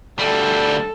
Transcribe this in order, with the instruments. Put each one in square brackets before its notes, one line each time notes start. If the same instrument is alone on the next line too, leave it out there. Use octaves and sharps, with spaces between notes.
[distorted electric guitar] D2 G3 [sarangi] A4